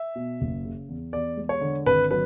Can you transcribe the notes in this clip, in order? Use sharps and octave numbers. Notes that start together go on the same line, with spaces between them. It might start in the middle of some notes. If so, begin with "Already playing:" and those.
Already playing: E5
B2
F#1
C#3
E2
E2 D5
G#3
C#5
D3
G#1 B4
F#3 B4